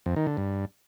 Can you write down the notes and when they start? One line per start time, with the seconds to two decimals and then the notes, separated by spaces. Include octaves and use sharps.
0.06 F2
0.16 D#3
0.27 D3
0.37 G2